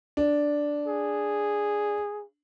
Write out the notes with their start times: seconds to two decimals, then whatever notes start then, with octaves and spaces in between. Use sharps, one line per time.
0.17 D4
0.87 G#4